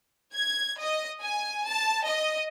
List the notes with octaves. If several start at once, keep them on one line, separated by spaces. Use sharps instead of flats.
G#6
D#5
G#5
A5
D#5